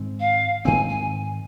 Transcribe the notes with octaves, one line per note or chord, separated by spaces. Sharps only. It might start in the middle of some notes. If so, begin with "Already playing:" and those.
Already playing: G#2 D#3 G#3 C4
F5
G#2 D#3 G#3 C4 G#5
G#5